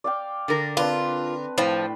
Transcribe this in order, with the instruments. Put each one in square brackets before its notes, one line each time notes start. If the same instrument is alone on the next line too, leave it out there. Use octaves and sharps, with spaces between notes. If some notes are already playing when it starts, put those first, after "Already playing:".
[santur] D5 F5 G5
[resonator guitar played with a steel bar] D3 A#4
[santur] C4 D4 B4 [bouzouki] F4
[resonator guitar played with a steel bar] A2 [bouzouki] F3 [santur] G5 B5